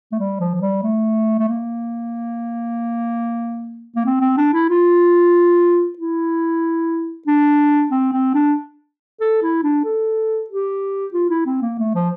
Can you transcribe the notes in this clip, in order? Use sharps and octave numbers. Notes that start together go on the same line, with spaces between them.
A3
G3
F3
F3
G3
A3
A3
A#3
A#3
C4
C4
D4
E4
F4
E4
D4
C4
C4
D4
A4
E4
D4
A4
G4
F4
E4
C4
A#3
A3
F3